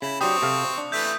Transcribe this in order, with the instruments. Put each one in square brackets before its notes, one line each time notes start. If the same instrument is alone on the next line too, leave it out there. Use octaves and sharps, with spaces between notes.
[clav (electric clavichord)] C#3 [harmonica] E4
[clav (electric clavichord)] F#3 D4 G4 [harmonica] C4 C#6 [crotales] D#6
[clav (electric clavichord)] C3 A4 F5
D4
[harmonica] E3 A3 E5 [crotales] G6 B6